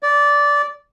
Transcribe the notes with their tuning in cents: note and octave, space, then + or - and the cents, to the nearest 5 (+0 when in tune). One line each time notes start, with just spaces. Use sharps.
D5 -15